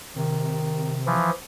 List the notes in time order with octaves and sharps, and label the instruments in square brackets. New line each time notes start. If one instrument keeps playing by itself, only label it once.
[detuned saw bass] C3 [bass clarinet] D#3
[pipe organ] E3 F3